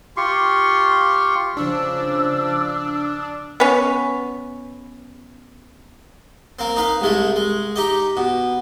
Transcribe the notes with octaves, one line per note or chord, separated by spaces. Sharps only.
F4 G4 C6 C#6
C#3 F3 D4 E6
B3 C#4
A#3 C4
D#4 B4 F5
C2 G#3 A3
G#3
D#4 G4 D#5
B2